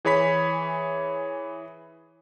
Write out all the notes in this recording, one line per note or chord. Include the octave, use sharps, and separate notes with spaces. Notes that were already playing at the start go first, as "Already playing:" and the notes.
E3 G#4 C#5 B5 B6